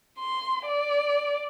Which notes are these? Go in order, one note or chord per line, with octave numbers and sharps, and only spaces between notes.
C6
D5